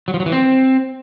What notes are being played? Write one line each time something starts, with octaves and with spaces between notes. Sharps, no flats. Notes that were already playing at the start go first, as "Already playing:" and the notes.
F#3
F3
F#3
E3
C4